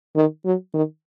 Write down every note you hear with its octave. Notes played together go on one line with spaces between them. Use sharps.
D#3
F#3
D#3